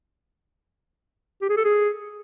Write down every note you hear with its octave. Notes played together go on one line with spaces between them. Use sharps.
G4
G#4
A4
G#4